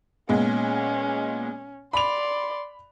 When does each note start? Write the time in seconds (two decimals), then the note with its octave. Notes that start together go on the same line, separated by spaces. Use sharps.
0.29 A#2 G#3 B3 C#4
1.93 D5 B5 C6 F7